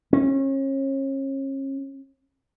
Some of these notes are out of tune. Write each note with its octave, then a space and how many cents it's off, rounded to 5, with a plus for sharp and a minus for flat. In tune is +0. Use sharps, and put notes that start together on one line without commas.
C#4 -35